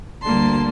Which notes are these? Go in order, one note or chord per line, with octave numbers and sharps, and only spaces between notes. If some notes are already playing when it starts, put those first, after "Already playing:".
D2 D3 G3 A#3 A5 C6